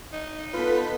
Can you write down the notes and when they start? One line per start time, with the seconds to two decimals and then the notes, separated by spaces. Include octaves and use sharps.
0.13 D#4
0.53 B3 F4 A4 B4 B6